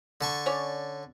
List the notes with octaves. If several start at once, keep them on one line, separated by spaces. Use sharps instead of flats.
D3 A5 C#6
C#4 C#5 D5